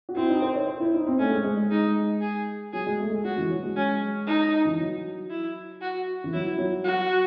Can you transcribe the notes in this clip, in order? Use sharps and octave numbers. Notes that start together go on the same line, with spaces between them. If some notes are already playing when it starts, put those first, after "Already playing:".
F#4
C4 E4
D#4
C5
C#5
C5
E4
D#4
C4
A3 C#4
G#3
G#3
G#3
D#4
G#4
F#3 G#4
G#3
A3
G#3
F#3 F#4
E3
F#3
G#3
C#4
D#4
E3
F#3
E4
F#4
E3
F#3 E4
F#3
F#4